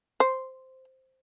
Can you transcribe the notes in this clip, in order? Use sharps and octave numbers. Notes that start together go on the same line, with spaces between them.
C5